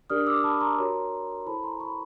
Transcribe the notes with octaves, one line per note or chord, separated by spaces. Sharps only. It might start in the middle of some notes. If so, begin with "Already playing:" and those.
D4 G4 A#4 D5 D#6 F6
D6 E6
A5 B5
A#5 C6
F#4 A#4 C#5
E4 A4 C5 A5 B5
A#5 C6
B5 C#6